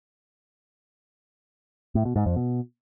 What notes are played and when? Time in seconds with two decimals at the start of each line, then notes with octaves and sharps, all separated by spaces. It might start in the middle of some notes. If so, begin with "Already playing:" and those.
1.95 A2
2.05 B2
2.16 G#2
2.26 F2
2.36 B2